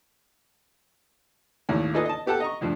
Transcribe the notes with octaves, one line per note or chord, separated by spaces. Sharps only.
G#1 D#2 A2
D#4 F4 G#4 A4 B4 D#5
D#5 A5
B3 G4 A4 F#5 A5
D#5 A#5 C#6
D2 G2 F3